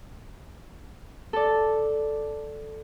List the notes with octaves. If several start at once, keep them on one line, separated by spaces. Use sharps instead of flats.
A4 D5